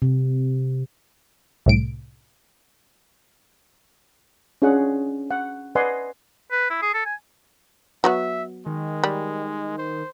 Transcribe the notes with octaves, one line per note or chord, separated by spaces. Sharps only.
C3
C2 A2 D7
C#4 D4 F4 G#4 D#5 F#5
F#5
B4 D5 D#5 F#5 G#5 C6
B4
E4
G#4
A4
G#5
F#3 B3 F#4 E5
D#3 G#3
G3
C5